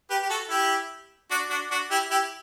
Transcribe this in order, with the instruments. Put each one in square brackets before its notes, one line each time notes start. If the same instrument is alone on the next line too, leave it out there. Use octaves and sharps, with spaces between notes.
[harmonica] G4 B4
G4
F#4 A4
E4 G4
D4 F#4
D4 F#4
D4 F#4
E4 G4
E4 G4